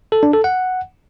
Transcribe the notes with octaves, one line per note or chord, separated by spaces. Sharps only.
A4
D4
A4
F#5